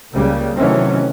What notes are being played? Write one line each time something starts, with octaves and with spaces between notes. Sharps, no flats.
C#2 C#3 G3 A#3
C3 D#3 E3 F#3 A3 C#4